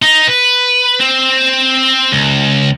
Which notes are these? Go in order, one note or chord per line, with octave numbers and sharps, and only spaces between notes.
D#4
B4
C4
C#2